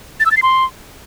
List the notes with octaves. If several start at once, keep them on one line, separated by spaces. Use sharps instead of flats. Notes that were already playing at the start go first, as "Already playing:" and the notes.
A6
E6
A6
C7
C6